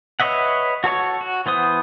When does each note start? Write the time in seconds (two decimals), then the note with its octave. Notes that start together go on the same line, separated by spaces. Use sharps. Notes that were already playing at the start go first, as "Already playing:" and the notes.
0.20 B4 C#5 D#5 E5 F#5
0.84 F#4 A4 C#5 C#6
1.21 F#4
1.46 E3 B3 C5 D#6